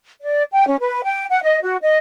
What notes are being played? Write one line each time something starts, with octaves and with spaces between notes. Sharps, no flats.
D5
G5
C#4
B4
G5
F#5
D#5
F#4
D#5